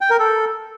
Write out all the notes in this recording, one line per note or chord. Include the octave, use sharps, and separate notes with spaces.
G5
A#4
A4